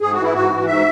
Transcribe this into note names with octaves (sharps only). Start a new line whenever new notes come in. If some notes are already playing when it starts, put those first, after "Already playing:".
G#2 G#4
F#4
E3 E4
G#2 F#4
E3
G#2 E5